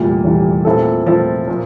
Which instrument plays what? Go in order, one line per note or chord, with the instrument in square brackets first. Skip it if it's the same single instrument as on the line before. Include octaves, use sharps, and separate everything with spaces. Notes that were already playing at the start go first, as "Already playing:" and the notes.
Already playing: [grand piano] F1 E2 E3 G3 [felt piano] A#2
[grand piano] F1 E2 E3 G3
A#2 A3 C4 E4 A4
[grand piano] A#2 A3 C4 E4 A4 [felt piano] F3
[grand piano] A#2 F3